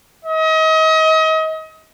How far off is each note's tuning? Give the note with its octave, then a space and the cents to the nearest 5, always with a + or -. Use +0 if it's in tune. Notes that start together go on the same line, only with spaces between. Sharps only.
D#5 +35